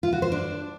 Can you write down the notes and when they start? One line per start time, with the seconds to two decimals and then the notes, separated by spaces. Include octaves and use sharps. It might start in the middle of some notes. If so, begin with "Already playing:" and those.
0.03 F4
0.13 F#4
0.22 C5
0.32 D4